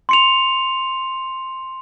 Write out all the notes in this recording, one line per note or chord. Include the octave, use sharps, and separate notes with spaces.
C6 C#7 F7